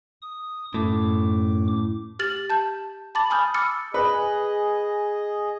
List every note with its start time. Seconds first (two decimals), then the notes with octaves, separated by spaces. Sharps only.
0.22 D#6
0.74 F#2 A2 D6
2.19 G4 F6 A6 F#7
2.50 A5 G6
3.15 A5 B5 D6 A6 F#7
3.30 G#5 B5 D#6 F6 G6
3.54 B5 D6 E6 F6 A6 C#7
3.94 G#4 B4 D#5